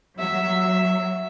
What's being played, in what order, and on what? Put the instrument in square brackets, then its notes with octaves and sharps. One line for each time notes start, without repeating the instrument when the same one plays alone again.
[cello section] F#3 [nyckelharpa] E5